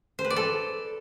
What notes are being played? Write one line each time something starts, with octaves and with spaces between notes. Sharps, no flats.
C5
B4
D5
A4